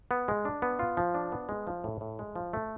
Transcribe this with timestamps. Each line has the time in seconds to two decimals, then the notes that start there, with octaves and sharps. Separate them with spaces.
0.11 B3
0.28 G#3
0.45 D4
0.62 B3
0.79 F4
0.97 F3
1.15 D4
1.32 B3
1.49 G#3
1.67 F3
1.84 A2
2.01 A2
2.19 G#3
2.36 F3
2.53 A3